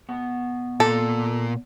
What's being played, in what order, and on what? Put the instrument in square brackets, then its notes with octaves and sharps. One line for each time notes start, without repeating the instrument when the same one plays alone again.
[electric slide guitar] B2 B3 F#5
[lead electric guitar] A#2 [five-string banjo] A4